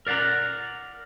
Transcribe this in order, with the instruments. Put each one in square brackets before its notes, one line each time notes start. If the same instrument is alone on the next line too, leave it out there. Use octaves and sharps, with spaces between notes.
[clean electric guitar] A#4 D5 F5 F#5 A#5